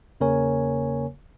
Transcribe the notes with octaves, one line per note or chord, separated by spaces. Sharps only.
E2 C#3 A#3 A#4 C#5 G#5